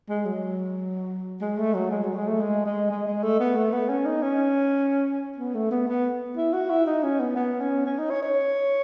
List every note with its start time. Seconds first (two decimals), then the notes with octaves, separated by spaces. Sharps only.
0.09 G#3
0.25 F#3
1.41 G#3
1.58 A3
1.74 F#3
1.91 G#3
2.03 F#3
2.16 G#3
2.28 A3
2.41 G#3
2.65 G#3
2.90 G#3
3.07 G#3
3.23 A3
3.40 B3
3.56 A3
3.72 B3
3.89 C#4
4.06 D#4
4.22 C#4
5.38 B3
5.55 A3
5.71 B3
5.87 B3
6.37 E4
6.53 F#4
6.70 E4
6.87 D#4
7.03 C#4
7.20 B3
7.36 B3
7.61 C#4
7.86 C#4
7.98 D#4
8.10 C#5
8.23 C#5